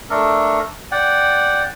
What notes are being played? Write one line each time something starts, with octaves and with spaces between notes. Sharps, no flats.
A3 D4 A4 A#4
D5 F#5 G5